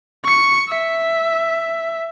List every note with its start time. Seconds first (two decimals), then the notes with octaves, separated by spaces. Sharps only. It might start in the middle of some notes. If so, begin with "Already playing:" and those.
0.24 C#6 C#7
0.69 E5